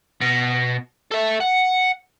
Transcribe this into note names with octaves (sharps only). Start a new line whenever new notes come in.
B2
A4 E5
F#5